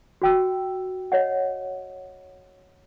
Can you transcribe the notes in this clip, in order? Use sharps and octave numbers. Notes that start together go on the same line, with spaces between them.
F#4 G5 E6
C#5 D#5 F#5